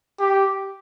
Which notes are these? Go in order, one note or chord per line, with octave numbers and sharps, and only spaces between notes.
G4